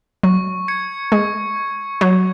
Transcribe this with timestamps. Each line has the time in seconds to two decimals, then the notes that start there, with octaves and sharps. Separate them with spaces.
0.23 F#3 C#6
0.68 G#6 C#7
1.12 G#3 C#6
1.56 G#6 C#7
2.01 F#3 G#6